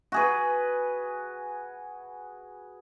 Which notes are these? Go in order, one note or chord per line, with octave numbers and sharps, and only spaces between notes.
F#4 G#4 B4